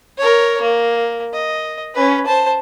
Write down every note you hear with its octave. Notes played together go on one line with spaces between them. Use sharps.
A#4 C#5
A#3
D#5
C#4 B4
C5 A5